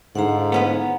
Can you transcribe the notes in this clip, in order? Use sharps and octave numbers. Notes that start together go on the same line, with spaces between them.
G#2 D3 E4 F5 F#5 A#5
B3 C#4 B4